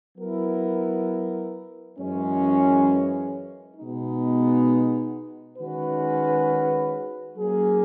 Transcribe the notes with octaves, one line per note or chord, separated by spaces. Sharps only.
F#3 B3 E4 A#4
F#2 E3 G#3 C#4
B2 G#3 B3 D#4
D#3 G#3 C#4 F#4 B4
F#3 A#3 C#4 G#4